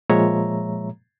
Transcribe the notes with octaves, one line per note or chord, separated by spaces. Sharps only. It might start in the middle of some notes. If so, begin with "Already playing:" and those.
A#2 F3 G#3 C#5 E5 A#5